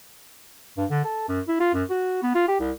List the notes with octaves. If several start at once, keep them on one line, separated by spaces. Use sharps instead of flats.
G2
D3
A4
F#2
E4
F4
F#2
F#4
B3
F4
G4
C2